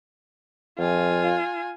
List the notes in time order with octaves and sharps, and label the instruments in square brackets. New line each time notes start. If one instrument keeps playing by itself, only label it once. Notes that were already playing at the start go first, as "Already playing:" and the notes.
[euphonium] F2 [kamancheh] F4 G#5